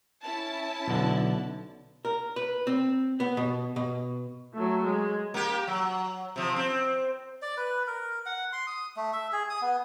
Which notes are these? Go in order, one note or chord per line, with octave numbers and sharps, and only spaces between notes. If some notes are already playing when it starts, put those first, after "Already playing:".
C#4 E4 A5
B1 D3
A#4
B4
C4
B3
B2
B2
F#3 A3
G#3
A#3 G4
F#3
C3 F3
C4
D5
B4
A#4
F#5
C6
D#6
A3
E5
G#4
D#6
B3